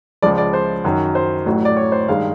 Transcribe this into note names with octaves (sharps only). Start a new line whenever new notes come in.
C#2 C#3 F3 G#3 D5
D5
C5
F#2 D#3 F#3
C5
A1 A2 F#3
D5
C#5
C5
G2 D#3 G#3 F5